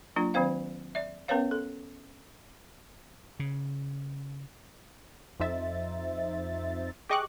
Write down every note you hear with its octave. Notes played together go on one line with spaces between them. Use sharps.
F#3 A#3 D4 F4
D#3 F#3 C4 C5 F5
D5 E5
B3 C#4 A#4 B4 C#5 F5
A4
C#3
F2 D#4 C5 E5 A6
G4 G#4 D#5 C#6 D6 F#6